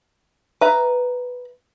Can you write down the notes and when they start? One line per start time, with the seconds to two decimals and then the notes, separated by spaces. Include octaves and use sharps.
0.61 B4 E5 A#5